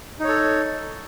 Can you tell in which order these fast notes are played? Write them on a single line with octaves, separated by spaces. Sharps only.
D#4 C#5 A4